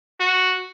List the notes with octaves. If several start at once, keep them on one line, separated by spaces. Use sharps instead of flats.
F#4